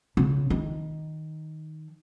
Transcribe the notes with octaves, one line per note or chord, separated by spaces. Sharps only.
C#3
D#3